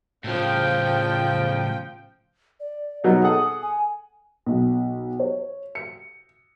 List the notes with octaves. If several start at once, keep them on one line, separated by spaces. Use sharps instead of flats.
A2 C#3 F3 G5
D5
B2 F#3 D#4 F#5
G#4 A4 F#5 D#6
G#5
B1
C#5
C#7